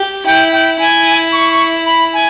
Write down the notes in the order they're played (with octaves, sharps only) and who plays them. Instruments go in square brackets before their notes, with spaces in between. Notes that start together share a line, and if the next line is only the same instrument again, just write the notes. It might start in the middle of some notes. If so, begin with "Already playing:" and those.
Already playing: [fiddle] G4
[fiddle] E4 [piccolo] G5
[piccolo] G5
[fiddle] E4 [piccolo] G#5
[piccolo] C#6
C#6
B5
G#5